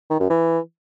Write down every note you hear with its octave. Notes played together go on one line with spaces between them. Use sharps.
D#3
F#2
E3